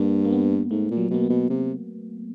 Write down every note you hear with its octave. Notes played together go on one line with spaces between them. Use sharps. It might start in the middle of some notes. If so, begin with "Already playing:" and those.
Already playing: G2 A#3
A#3
B3
G#2 A3
A#2
F#3
B2 A#3
B3
B2
C3